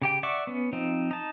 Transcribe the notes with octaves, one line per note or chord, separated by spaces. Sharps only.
C#3 G4 G5
D5 E5 F#5 C#6 D6
B3 C#4
F3 C4 D#4
D#4 A5